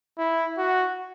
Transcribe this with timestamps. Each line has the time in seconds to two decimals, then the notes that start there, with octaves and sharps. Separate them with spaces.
0.18 E4
0.58 F#4